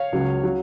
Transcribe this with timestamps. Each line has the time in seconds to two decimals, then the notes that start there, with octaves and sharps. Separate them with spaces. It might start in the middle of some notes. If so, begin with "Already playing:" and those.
Already playing: C#5 F5
0.12 C#2 C#3 F#3
0.44 C#3 F#3